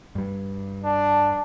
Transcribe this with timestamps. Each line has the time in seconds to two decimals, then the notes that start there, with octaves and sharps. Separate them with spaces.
0.15 G2 G3
0.84 D4 A5